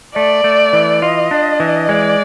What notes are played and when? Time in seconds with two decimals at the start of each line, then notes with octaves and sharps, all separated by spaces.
0.15 A3 D5
0.44 A3
0.73 E3
1.02 F4 D#5
1.31 D4
1.60 E3
1.89 G#3 D5